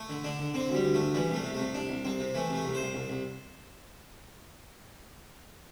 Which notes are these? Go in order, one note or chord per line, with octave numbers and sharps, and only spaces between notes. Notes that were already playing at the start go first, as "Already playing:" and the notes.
Already playing: A3
D3
D3 D4
D3
D3 C4
D2
G3
D2
A3
D2
E3 G3
C2 A3
C3
A3
C2
C2 D4
C2
C2 C4
C3
E3 A3
C3 A3
C2
C5
C2
C2
C2